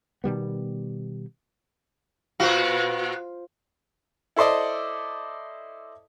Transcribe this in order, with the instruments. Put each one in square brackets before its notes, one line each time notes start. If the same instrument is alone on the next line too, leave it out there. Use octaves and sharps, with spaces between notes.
[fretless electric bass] B2 D#3 G3 B3
[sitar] A#2 B3 F#4 [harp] F4 C5
[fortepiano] E4 A4 C5 D5 D#5